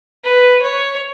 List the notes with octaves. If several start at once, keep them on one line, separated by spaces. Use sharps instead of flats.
B4
C#5